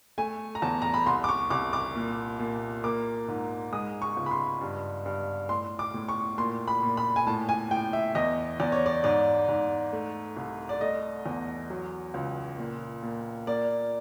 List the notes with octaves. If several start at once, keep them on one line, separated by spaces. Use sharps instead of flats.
A3 G#5
A#5
E2 A5
A#5
B5
C2 C6
D6
C#6
C2 D6
D6
A#2
A#2
A#3 D6
G#2
G#3 D#6
C#6
C#2
B5
C6
G2
G2
A2 C6
D6
A2
C#6
A#2 C6
B5
A#2
B5
G#5
A2 A5
G#5
A2 G5
E5
E2 D#5
E2 D5
C#5
D5
G#2 D5
G#2
A3
C2
D5
A3 D#5
E2
F#3
C#2
A#2
A#2
A#3 D5